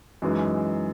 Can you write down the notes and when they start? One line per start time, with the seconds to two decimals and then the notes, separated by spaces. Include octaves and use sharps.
0.22 F#2 E3 G#3 D#4